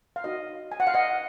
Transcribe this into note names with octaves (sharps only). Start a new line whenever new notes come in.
F5
D#4 F#4 A#4 D#5
G#5
F#5
F5
D#5 F#5